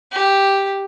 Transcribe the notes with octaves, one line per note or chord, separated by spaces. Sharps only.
G4